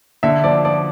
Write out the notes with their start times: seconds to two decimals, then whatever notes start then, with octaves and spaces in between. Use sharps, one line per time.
0.23 D3 E5
0.44 F3 D5
0.65 F3 D5